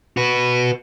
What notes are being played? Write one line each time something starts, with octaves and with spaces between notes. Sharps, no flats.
F#4 B4